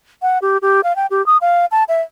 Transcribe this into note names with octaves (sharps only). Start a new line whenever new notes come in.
F#5
G4
G4
F5
G5
G4
D#6
F5
A5
E5